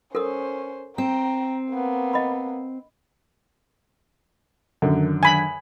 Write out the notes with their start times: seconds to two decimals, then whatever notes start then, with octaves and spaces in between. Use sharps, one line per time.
0.15 C#4 A4 A#4 C5 D#6
0.98 C4 G5 A#5
1.72 A#3 B3
2.13 D#5 B5
4.82 F#2 D3 D#3 F#3 D4
5.23 G#5 B5